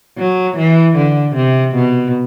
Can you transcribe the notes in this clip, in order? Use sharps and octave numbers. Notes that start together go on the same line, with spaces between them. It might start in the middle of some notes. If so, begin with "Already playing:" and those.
F#3
E3
D3
C3
B2